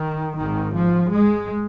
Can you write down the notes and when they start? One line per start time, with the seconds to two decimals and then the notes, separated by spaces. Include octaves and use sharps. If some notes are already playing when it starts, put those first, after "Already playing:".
Already playing: D#3
0.38 G#1 G#2 D#3
0.76 F3
1.13 G#3